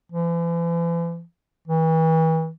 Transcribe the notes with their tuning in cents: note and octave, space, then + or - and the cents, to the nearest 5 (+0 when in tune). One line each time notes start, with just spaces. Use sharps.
E3 +45
E3 -35